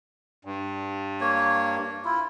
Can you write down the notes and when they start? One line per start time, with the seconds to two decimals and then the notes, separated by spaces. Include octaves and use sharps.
0.45 G2
1.21 A#3 C#5
2.05 E4 F4